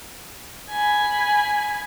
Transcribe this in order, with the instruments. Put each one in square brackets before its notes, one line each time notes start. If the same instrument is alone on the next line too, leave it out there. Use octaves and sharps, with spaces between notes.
[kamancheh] G#5 B5